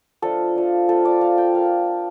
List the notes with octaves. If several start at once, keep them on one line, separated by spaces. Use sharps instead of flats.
F3 A3 D4 F4 A4
F3 A3 D4 F4
A3 C4 F4 A4
D5
A3 C4 F4 F5
G5
A#3 F5